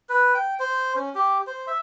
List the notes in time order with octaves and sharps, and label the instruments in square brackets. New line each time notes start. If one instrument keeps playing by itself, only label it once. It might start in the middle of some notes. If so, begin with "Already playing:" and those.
[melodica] B4
G5
C5
C#4
G4
C5
E5